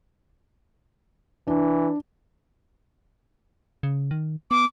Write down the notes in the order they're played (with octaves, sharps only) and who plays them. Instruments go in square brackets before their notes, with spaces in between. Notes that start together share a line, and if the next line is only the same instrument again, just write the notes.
[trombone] E3 [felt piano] D4
[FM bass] C#3
D#3
[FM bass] B3 [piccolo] D6